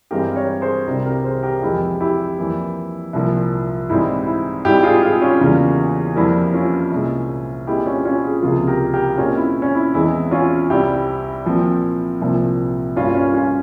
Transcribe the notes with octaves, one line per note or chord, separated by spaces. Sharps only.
G2 E3 G#3 C4 G4 A#4
A#4 C#5
G#4 C5
C2 C3 G3 G4 A#4
G4 A#4
G#4 C5
G4 A#4
F2 E3 G#3 C4 E4 G4
E4 G4
F2 E3 G3 A#3
C2 A#2 F3 A#3
G#2 E3 G3 C4 E4
E4
G#2 G3 C4 E4 G4
F4 G#4
F4 G#4
C#4 F4
E2 C#3 G3 A#3
F2 E3 G3 A#3 E4
C#4 F4
C2 A#2 G#3
A#2 G#3 C4 E4 G4
C#4 F4
C#4 F4
F4 G#4
C#2 C3 F3 A#3 F4 G#4
G4 A#4
G4 A#4
A#2 G#3 C4 C#4 F4
E4
C#4
E4
E2 E3 G#3 C4 E4
C#4 F4
C2 C3 G3 C4 E4 G4
A#2 F3 C4
C2 A#2 F3 C4
G2 G3 A#3 C#4 F4
C#4
C#4 F4